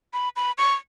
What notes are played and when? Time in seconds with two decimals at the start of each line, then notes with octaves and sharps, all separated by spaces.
0.13 B5
0.36 B5
0.58 C#6